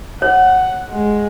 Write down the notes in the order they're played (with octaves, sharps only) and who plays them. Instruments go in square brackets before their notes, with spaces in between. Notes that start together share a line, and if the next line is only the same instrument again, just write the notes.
[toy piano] C#5 [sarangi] F#5
[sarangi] G#3